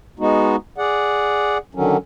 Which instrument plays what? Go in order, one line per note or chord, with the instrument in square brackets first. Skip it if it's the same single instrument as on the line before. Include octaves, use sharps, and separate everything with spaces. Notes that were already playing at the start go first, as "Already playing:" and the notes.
[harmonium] G#3 B3 D#4 F#4
G#4 D5 F#5
D3 D#3 F#3 C#4